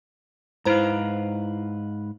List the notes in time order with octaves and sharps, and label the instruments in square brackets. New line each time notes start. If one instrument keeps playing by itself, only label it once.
[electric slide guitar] G#2 B4 F5 [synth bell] E4 C5 A#5